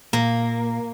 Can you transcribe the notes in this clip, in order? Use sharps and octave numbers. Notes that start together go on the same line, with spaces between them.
A#2 A#3